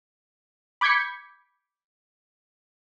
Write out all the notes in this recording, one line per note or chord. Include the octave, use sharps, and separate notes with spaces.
B5 D6 G6 G#6 B6 C#7